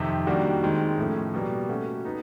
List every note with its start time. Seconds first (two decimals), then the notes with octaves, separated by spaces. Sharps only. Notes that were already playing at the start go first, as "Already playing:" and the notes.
Already playing: F2 C3 D#3
0.27 D#3 G3 A#3 D4 F#4
0.63 D#3 G#3 C4
0.98 A2 F3 A3 C#4
1.33 B2 G3 A#3
1.69 A3 C#4 F#4
2.05 B3 D#4